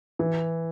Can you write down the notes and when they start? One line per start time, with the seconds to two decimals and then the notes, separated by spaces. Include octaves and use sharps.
0.19 E3